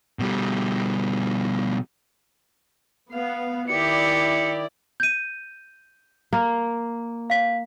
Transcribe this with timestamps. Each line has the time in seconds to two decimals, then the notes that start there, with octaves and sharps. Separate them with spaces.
0.19 B2 G3
3.12 B3 F5
3.68 D#3 E4 G4 D5 C#7
5.00 G6 D#7
6.33 A#3
7.30 F5 B6